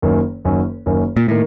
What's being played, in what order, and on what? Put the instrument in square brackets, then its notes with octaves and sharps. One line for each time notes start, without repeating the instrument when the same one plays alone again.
[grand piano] F#1 F#2 D#3 A#3 C#4
F#1 F#2 D#3 A#3 C#4
F#1 F#2 D#3 A#3 C#4
[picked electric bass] A#2
[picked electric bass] A2 [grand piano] D#3 A#3